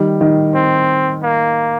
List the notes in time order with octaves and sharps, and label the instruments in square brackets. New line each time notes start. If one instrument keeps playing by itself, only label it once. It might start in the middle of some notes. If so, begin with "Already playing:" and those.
Already playing: [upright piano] D#3 G3
D#3
[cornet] C4
A#3